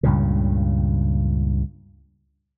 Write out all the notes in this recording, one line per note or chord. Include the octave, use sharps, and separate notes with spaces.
C#2 G2 A#2 C#3